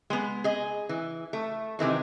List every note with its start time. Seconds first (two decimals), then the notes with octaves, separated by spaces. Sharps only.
0.10 G#3 B3
0.44 G#4 D#5
0.89 E3
1.33 A3
1.79 C3 D#3 E3 G#3